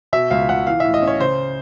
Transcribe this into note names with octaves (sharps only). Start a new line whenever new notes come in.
B2 E5
C#2 F5
C#2 F#5
E3 F5
A2 E5
D#5
C#4
C#5
C#3 C5